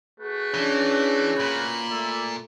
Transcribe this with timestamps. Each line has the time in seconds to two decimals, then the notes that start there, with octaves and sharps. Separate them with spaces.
0.20 A3 F#4 G#4 B4
0.54 E3 C#4 D4
1.40 A#2 B5
1.90 A3 D5 E5